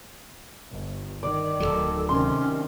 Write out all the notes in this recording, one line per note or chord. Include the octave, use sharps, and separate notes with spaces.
G1
D#3 D5
D1 A#1 F#3 A4
C3 D#3 C#4 C6